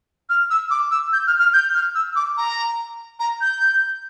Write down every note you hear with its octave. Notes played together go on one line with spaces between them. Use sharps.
F6
E6
D6
E6
G6
F6
F6
G6
F6
E6
D6
A#5
A#5
G6